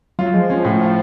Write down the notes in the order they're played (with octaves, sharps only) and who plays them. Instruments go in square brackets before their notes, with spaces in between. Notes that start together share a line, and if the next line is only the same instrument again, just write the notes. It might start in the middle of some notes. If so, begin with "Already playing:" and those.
[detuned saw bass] F#3 [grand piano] F4
[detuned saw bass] F3 [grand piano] G#3
[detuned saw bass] F3 [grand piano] C#4
[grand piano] A2
F4